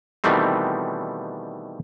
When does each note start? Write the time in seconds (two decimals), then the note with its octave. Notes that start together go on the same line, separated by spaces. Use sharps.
0.24 B2 D#3 E3 G3 A3 C4